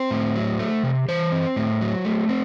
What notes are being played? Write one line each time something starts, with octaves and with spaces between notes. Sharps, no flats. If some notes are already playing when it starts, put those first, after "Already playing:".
Already playing: C4 C5
A2
F#3
A3
C3
E3 C5
C4
A2
F#3
A3
C4